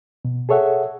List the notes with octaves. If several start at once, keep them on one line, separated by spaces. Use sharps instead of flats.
B2
G#4 A4 C#5 E5 F#5